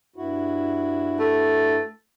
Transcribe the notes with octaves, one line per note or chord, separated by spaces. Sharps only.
G2 E4 F#4
A3